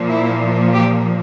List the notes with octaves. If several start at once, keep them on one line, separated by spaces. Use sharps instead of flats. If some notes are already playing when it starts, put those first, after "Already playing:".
Already playing: A#2 F3 A#3
E4
G4